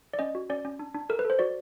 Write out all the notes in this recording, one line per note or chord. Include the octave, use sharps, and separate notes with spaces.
D5
C#4 D#5
F#4
C#4 D5
C#4
D4
D4
A4 A#4
B4
A4
C5
F#4 D5